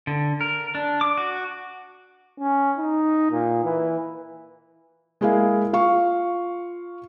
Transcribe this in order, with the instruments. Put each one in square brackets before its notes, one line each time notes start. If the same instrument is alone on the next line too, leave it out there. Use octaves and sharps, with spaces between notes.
[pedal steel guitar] D3
A#4
D4
D6
F#4
[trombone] C#4
D#4
A#2
E3
[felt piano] G#3 A#3 E4 G#4 F5
F4 F5 C#6